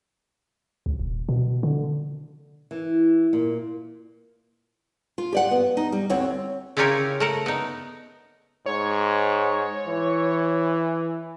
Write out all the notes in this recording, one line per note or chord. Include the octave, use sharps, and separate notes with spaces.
C#2
D#1
B2
D3
E3
A#2
F4
G4 D5 F#5
B3
D#4
G3
D2 C4 C#5 F#5
C#3 E4 F4 G4 A#4 C#5
A3 A#4 F#5
B3 D#4
G#2 C#5
E3